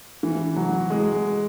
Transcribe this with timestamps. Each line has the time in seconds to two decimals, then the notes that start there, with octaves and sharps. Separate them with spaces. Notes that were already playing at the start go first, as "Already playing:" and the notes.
0.23 E3
0.56 F#3
0.90 G#3